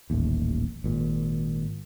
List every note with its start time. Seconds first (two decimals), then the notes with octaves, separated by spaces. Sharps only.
0.10 D#1 A1 D#2
0.84 G#1 A#2